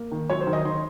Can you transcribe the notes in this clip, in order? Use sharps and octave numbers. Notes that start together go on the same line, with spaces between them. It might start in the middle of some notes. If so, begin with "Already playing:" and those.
Already playing: A#3
D#3
F#3 C#5
C5
D#3
D#5
D#3 C6